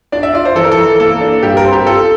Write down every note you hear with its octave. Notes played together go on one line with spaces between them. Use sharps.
D4 D5
E5
F4 D5
C5
E3 A4
A#4
A4
E3
A#3 A4
D4
G2 G4
A#4
C4
G4
F4 A4